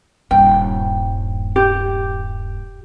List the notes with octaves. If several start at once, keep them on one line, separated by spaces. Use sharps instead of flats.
D#1 G2 G5
G4